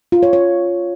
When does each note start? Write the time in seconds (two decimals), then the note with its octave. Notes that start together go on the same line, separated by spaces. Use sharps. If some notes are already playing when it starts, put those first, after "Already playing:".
0.12 F4
0.23 C#5
0.33 C#5